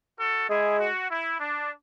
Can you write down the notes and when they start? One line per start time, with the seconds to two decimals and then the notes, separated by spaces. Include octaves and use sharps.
0.20 F#4 A4
0.50 G#3 E4 G#4
0.80 F#4
1.10 E4
1.40 D4